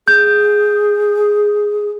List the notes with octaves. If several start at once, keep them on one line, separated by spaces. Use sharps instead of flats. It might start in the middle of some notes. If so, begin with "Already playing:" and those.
G#4 G6